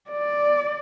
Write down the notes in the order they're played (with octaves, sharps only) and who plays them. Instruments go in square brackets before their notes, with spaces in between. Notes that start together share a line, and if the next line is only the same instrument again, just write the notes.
[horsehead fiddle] D5